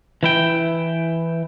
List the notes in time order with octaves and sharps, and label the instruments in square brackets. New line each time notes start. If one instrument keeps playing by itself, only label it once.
[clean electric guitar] E3 E4 G5